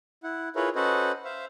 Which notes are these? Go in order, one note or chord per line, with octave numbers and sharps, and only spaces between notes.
E4 F#5
E4 F4 G#4 A#4 B4 C#5
C#4 F#4 A4 B4 C5 D#5
C5 E5 F5